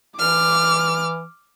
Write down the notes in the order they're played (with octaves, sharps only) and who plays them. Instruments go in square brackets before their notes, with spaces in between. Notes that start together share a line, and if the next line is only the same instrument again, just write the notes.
[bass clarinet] E3 [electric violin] D6 [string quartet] F6